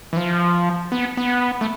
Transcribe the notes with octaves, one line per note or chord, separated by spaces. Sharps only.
E3
F3
B3
B3
A3